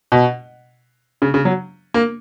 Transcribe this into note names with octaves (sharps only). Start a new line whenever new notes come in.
B2
C#3
C#3
F#3
A#3